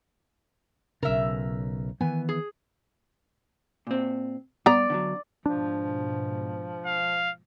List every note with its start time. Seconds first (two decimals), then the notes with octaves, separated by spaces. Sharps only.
1.03 B1 C#3 A#4 E5
2.01 D#3 E3 B3 G#5
2.29 G#4
3.87 A#2 C4
4.66 G2 B3 D5 A#5
4.90 D3 F3 F#3
5.46 G#2 B2 F3 G#3 D4
6.86 F5